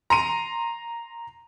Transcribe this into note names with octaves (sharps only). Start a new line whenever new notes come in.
A#5 C6 D#7